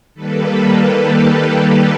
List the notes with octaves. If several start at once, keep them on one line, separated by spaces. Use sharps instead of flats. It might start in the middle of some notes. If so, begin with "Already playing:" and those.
D#3 G3 A#3 A4 B4
G4 A4
G4 A4